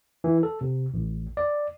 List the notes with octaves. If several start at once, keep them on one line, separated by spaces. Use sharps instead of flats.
E3
A4
C3
A1
D5